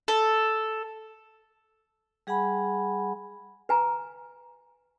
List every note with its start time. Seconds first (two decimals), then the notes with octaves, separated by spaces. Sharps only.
0.08 A4
2.27 G3 G#4 F#5 G#5 B5
3.69 B4 G#5 A#5